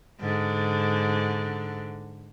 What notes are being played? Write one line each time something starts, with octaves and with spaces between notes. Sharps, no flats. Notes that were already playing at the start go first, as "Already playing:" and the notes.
G#2 D3